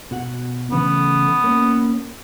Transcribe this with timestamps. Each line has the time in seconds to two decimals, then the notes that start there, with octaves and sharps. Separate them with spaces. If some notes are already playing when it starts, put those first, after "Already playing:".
0.11 B2 F#4 F#5
0.72 C#3 E3 A3 B3
1.44 A#3 C#4